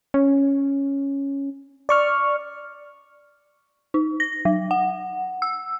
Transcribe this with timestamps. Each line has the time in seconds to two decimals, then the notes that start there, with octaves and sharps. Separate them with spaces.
0.14 C#4
1.89 D5 C#6 F6
3.94 D#4
4.20 A#6
4.45 F#3
4.71 F#5
5.42 E6